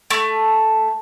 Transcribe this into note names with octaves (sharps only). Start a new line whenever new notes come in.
A3